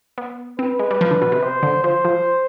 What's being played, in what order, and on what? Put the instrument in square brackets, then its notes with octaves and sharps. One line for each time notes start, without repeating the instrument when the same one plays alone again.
[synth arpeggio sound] B3
[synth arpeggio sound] C4 [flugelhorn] B4
[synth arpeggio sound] G#3
G3
F3
D3
B2
C3
[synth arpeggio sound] C3 [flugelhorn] C5
[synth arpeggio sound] D3
[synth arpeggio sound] F3 [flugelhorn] C5
[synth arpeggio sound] F3